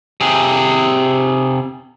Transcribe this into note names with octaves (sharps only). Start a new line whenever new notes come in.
C3 G#4